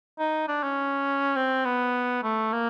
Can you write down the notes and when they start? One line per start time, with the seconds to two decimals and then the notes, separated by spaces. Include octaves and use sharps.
0.19 D#4
0.48 D4
0.63 C#4
1.36 C4
1.65 B3
2.23 A3
2.52 A#3